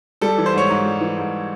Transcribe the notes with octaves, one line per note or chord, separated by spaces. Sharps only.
G3 A4
E3
C5
G#2 C#5
G#2
G3
E3
G#2